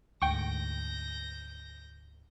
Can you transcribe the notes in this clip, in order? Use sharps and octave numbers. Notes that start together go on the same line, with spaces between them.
D2 G#2 G5 C#6 G6 A#6